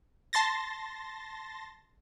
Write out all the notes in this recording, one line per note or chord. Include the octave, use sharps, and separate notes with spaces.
A5 C6 A6 A#6